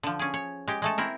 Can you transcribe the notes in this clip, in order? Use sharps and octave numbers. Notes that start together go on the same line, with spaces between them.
D3 F3
C#4 G#4
C#5
G#3 G4
G#3 A3 A4
C4 E4 A#4